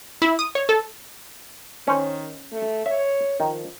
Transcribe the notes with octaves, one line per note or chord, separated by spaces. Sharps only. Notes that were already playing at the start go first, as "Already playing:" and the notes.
E4
D#6
C#5
A4
D#3 C#4 C5
A3
C#5 E5
D#3 F3